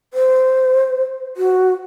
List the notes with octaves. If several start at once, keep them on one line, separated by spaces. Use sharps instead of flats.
C5
F#4